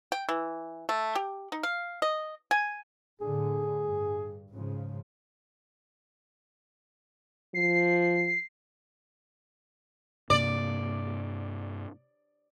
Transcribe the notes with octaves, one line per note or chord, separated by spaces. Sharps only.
G5
E3
A3
G4
D#4
F5
D#5
G#5
A2 D3 G#4
G2
G#2 C#3 F3
F3 C7
G2 C3 A#3 D5